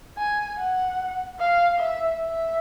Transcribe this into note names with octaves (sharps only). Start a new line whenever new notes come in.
G#5
F#5
F5
E5
E5